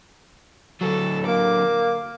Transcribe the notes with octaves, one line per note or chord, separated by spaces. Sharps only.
D3 F#3 A4
A#3 D6